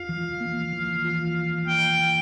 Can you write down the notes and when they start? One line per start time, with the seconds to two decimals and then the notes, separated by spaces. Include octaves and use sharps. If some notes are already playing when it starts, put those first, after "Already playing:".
Already playing: F4 F5
0.09 E3
0.41 A#3
0.73 E3
1.05 F4
1.37 E3
1.67 A#3 G5
1.99 E3